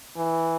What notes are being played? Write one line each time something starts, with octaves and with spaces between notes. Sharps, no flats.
E3